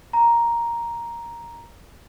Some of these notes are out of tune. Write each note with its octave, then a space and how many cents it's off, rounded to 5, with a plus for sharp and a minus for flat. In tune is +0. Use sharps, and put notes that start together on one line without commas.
A#5 +5